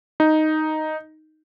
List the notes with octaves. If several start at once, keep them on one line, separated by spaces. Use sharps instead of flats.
D#4